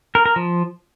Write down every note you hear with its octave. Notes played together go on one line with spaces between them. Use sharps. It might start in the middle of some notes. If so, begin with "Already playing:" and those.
A#4
A#4
F3